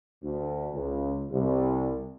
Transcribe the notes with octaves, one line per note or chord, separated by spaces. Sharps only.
D2
C#2
C2